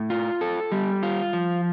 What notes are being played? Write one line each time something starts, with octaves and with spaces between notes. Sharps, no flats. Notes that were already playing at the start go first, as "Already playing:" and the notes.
Already playing: A2
F4
A4
G3
F4
F3